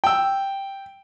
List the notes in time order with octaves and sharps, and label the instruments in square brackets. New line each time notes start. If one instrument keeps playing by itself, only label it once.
[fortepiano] G5 E6